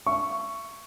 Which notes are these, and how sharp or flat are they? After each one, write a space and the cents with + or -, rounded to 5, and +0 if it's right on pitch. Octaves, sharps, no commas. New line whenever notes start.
E5 +30 C#6 +0